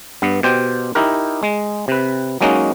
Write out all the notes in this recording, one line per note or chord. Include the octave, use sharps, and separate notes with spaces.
G2 B3
B2 G4 C5 G5
D#4 E4 G4 A#4
G#3
C3 B4
F#3 G#3 A#3 C#4 D#4 F#4